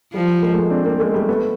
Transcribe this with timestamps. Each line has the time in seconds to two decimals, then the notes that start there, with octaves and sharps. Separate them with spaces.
0.13 F3 G3
0.42 G#3 A#3
0.53 A3
0.56 G#3 A#3
0.70 C4 D4
0.85 A#3 C4
1.00 G#3 A#3
1.14 G3 A3
1.29 A3 B3